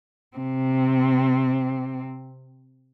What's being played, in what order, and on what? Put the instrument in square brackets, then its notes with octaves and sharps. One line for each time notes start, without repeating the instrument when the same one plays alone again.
[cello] C3 C4